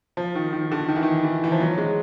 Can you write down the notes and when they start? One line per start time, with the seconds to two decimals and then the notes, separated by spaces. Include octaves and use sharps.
0.17 F3
0.35 D#3
0.53 D#3
0.72 D3
0.88 D#3
0.96 E3
1.03 D#3
1.24 E3
1.44 E3
1.52 F3
1.60 F#3
1.78 G#3